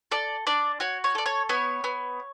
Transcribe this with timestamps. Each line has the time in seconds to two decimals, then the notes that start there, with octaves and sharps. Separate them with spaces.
0.11 A4 D5
0.47 D4 D5
0.80 F#4 C#5
1.04 C#5
1.15 A4 D5
1.26 C#5
1.49 B3 C#5
1.84 B3